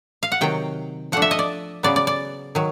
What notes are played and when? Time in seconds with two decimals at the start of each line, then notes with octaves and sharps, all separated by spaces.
0.23 F5
0.32 F#5
0.41 C3 D#3 F#3 G5
1.12 F3 A3 D4 F#5
1.22 E5
1.31 D#5
1.39 D5
1.83 C#3 F#3 B3 D5
1.96 D5
2.07 D5
2.55 D#3 F#3